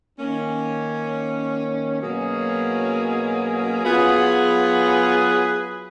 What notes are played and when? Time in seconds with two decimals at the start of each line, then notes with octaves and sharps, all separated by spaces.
0.19 D#3 A#3 C#4
2.01 B2 F#3 A#3 C#4 G#4
3.83 F#3 B3 F4 G#4 B4